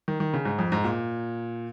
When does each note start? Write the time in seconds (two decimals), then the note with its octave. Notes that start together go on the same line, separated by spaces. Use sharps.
0.08 D#3
0.20 D#3
0.34 C#3
0.45 G#2
0.59 F2
0.72 G#2
0.84 A#2